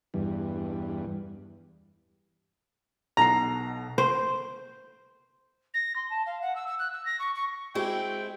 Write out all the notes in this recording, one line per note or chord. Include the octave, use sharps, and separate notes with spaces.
E2 G2
B1 B2 A#5 C7
C5
A#6
C6
A5
F5
F#5
E6
E6
F#6
E6
A#6
C#6
C#6
G#3 C4 E4 F#4 G4 G5